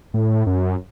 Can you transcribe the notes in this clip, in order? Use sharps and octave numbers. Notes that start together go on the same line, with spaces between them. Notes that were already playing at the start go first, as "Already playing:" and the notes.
A2
F#2